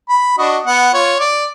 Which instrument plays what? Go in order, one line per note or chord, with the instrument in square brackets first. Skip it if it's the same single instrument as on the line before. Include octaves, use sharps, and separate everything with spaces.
[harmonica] B5
D4 F#4 D#5
B3 F#5
F4 C#5
D5